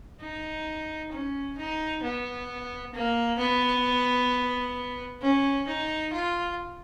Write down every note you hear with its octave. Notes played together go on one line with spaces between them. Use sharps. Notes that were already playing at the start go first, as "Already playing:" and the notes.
D#4
C#4
D#4
B3
A#3
B3
C#4
D#4
F4